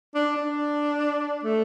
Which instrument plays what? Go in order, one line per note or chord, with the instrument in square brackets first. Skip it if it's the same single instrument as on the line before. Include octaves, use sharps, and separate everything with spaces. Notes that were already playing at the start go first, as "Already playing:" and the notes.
[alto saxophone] D4
D4
A3